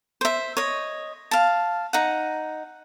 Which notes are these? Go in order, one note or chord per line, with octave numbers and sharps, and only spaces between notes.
C5 E5
C#5 D#5
F5 A5
D#4 F#5